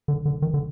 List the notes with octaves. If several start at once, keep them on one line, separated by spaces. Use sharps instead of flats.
D3
D3
D#3
D3